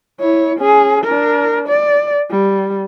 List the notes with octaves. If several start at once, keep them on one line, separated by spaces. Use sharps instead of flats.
E4 C#5
C#4 G#4
D4 A#4
D5
G3